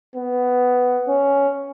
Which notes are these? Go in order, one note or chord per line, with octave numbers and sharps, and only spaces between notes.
B3
C#4